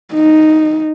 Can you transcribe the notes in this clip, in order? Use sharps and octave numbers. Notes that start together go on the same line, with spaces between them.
D#4